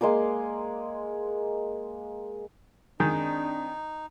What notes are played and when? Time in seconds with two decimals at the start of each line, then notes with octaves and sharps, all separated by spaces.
0.01 G#3 A#3 C6 D6
3.00 D#3 G#3 C4 D4 D#4